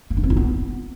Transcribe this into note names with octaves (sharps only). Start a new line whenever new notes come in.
A#3
D4
C4
F4
B3